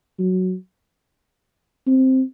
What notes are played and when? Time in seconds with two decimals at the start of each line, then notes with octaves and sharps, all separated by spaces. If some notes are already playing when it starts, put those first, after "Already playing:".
0.19 F#3
1.87 C4